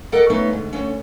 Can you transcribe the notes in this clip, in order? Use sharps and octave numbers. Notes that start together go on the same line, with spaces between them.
A4 A#4 D5 D#5 F#5
A3 B3 C#4 D#4
D2 G#2
D2 C#4